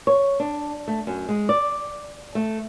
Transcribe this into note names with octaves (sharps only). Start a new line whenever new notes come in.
C#5
D4
A3
F#2
G#3
D5
A3